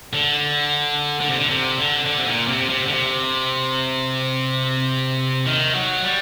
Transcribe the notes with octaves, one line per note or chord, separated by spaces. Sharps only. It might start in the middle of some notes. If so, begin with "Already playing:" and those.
D3
D3
C3
D3
C3
D3
D3
C3
A#2
C3
C3
D3
C3
D#3
F#3
G3